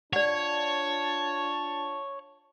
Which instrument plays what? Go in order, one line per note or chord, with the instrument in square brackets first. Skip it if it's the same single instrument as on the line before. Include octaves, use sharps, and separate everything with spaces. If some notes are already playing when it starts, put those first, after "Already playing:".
[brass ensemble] D4 F4 A5 [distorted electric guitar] C#5 [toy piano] D5 F#5